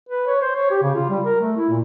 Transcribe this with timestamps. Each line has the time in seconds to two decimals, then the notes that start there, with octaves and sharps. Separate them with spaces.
0.09 B4
0.27 C#5
0.42 C5
0.56 C#5
0.71 G4
0.82 C#3
0.95 F4
1.10 G3
1.24 A#4
1.41 A3
1.57 E4
1.70 A#2